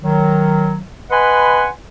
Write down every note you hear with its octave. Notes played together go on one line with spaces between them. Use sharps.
D#3 F#3
B4 D#5 F#5 G#5 B5 C6